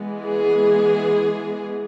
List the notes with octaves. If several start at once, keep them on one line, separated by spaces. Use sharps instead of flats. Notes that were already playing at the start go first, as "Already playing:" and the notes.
Already playing: E3 G#3 B3
G#4